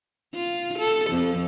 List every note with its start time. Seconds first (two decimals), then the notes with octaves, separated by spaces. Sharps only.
0.34 F4
0.79 A4
1.10 F2